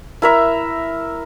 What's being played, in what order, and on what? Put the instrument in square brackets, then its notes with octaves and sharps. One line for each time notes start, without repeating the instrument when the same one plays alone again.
[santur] E4 A#4 E5